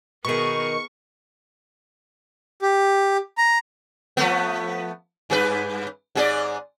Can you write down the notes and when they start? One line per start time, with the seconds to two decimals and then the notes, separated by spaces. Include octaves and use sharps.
0.25 B2 D#3 B3 G#4 A#4 C#6
2.62 G4
3.38 A#5
4.17 F3 A3 B3
5.30 G2 G#4 B4
6.15 G#2 G#4 D5